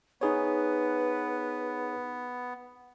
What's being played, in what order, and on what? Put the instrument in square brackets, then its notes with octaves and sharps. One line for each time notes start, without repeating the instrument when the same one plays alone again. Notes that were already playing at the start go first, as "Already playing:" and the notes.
[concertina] B3 [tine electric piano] D#4 G#4 C#5 [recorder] B4